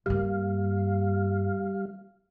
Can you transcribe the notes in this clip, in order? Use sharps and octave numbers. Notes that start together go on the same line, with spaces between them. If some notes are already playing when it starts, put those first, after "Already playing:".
G2 G3 A#3 F5